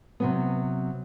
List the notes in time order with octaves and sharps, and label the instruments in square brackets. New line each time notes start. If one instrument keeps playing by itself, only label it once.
[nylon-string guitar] C3 F#3 B3